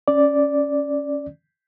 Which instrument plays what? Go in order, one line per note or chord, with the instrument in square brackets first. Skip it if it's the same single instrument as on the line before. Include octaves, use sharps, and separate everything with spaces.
[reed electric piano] C#4 D5